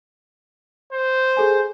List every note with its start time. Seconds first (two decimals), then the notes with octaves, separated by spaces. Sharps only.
0.92 C5
1.37 G#4 A4 G#5